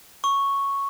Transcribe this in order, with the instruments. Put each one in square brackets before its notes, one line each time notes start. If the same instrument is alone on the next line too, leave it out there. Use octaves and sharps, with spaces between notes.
[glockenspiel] C#6